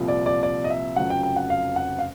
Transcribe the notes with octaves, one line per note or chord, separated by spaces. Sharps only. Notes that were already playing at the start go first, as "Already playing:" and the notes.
Already playing: C2 A#2 F3
D5
D5
D5
D#5
E5
F1 F2 C#3 F#3 F#5
G5
G5
F#5
F5
F#5
F5